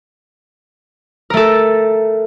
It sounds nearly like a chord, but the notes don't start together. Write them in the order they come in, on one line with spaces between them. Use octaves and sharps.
A#4 A3 A4